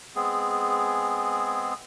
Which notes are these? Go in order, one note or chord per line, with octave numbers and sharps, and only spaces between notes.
G#3 B3 C4 G#4